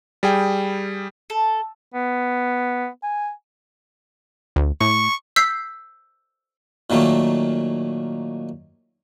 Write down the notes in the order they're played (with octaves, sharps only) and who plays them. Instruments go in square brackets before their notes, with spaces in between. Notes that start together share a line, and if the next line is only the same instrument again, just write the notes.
[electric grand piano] G3 G#4 G5
[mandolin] A4
[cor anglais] B3
G#5
[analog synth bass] D2
[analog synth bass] A2 [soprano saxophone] C#6
[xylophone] E6 G6 B6 C7
[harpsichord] A#2 D#3 F#3 A3 A#3